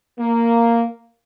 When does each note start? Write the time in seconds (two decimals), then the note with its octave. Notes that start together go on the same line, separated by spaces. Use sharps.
0.19 A#3